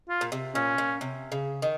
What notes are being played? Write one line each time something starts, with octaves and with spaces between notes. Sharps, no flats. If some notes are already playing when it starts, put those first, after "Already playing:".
F4
A#2
C3
A#2 C#4
A#2
C3
C#3
D#3